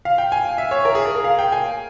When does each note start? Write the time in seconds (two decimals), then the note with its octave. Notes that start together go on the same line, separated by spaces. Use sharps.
0.05 F5
0.18 G5
0.32 G#5
0.58 E5
0.71 C#5
0.85 A#4
0.95 G#4
1.06 G#4
1.15 A#4
1.24 F5
1.39 G5
1.52 G#5